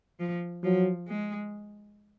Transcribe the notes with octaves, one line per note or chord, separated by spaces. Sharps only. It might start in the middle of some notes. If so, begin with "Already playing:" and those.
F3
F3 F#3
G#3